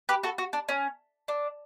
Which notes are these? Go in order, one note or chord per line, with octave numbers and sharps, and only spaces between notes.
G4 B4
F#4 A4
F#4
D4
C#4
D4